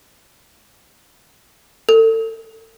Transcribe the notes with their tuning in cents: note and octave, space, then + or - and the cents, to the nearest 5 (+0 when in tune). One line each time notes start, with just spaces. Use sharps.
A4 +35